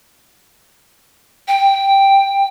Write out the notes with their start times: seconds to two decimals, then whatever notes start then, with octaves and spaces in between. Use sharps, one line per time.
1.48 G5